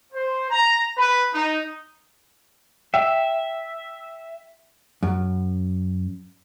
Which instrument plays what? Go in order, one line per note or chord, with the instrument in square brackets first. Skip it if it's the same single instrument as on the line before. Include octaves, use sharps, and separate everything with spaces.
[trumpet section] C5
A#5
B4
D#4
[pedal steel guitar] E5 [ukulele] G5
[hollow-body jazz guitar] F#2